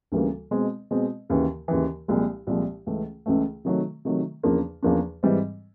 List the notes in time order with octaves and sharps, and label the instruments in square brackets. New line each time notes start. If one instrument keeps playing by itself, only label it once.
[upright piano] D2 C#3 E3 G3 A#3
B2 G#3 C4
B2 G#3 C4
D#2 C#3 E3
D#2 C#3 E3
C2 A#2 F3 G#3
C2 A#2 F3 G#3
C#2 C#3 E3 A3
C#2 C#3 E3 A3
C3 D#3 F#3 A3
C3 D#3 F#3 A3
E2 C#3 F3 A#3 D4
E2 C#3 F3 A#3 D4
G#2 E3 G3 C4